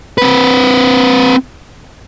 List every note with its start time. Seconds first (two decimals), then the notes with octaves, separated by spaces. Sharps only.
0.18 C4 B4